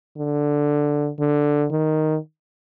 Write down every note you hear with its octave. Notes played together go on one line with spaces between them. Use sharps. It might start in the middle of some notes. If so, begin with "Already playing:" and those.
D3
D3
D#3